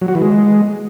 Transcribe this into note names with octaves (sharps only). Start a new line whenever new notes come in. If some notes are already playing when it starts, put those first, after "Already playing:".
F#3
F#4
E3
G#3